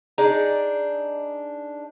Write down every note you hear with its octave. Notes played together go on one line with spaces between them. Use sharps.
D4 D#4 G#4 D5